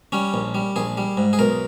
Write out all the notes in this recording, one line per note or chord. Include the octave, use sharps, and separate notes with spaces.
G3 C#4
A#1
G3
A#1 G#4
G3
G#2
G#4
B1 A#4